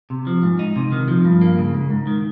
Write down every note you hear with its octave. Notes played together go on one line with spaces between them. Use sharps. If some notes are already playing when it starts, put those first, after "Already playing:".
C3
F3
G#2
D#4
C3
D#3
F3
G2
A#3
C#3
G#2
G#2
D#3